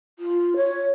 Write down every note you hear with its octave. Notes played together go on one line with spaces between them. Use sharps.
F4
C#5